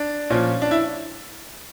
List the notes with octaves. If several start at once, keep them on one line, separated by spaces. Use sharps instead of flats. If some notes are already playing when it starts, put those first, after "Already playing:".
Already playing: D4
A#2 F3 C#4
D4
E4